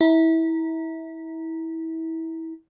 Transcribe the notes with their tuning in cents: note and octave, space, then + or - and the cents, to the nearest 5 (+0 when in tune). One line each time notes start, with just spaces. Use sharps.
E4 -25 A#5 +0